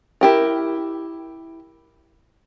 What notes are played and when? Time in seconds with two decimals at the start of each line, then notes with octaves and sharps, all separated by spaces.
0.21 E4 G4 A#4